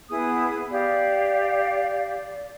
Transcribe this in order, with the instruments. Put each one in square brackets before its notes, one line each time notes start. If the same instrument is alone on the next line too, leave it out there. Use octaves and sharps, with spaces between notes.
[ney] B3 [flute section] E4 G#4 D#6
[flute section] G4 F5 [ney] D5